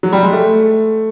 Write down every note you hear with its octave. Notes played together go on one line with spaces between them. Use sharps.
F#3
G3
G#3
A3